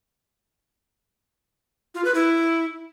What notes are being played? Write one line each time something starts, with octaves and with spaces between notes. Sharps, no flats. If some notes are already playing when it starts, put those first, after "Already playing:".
F4
B4
E4